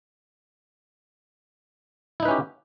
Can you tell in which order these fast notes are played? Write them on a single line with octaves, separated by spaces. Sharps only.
E4 D#4 B4 C#4 G4